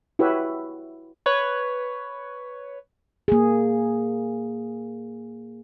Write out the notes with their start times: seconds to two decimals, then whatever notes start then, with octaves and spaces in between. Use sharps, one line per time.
0.19 E4 F#4 G4 B4 C#5 E5
1.26 B4 C#5
3.28 A#3 G#4